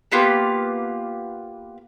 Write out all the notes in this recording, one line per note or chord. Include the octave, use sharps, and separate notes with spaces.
A#3 B3 F4 G4